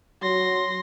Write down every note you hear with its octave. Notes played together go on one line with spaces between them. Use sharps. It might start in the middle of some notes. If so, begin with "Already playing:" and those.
F#3 C6 A#6